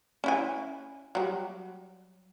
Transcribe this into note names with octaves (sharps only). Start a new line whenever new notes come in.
C#4 E4 G#5
F#3 G3